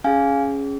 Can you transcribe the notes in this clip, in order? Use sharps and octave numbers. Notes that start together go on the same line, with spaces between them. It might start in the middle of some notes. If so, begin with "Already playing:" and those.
C#4 G#4 F5 G#5